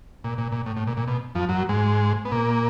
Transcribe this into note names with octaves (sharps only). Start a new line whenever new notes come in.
A#2
A#2
A#2
A2
A2
A#2
A#2
B2
F2 F3
F#2 F#3
G#2 G#3
B3
A#2 A#3